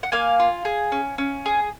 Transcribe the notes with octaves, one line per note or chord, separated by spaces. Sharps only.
F#5
A#3 F5 G#5
F4
G#4
C#4
C#4
G#4